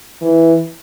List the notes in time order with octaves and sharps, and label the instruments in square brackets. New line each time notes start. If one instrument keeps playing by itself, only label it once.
[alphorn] E3